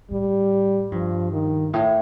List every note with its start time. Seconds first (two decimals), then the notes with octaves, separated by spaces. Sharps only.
0.11 A2 G3
0.92 G2 F3
1.32 D#3
1.73 A2